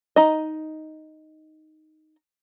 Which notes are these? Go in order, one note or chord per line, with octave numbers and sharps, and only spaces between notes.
D#4 D#5